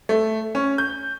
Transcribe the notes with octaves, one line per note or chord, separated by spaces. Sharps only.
A3
C#4
G6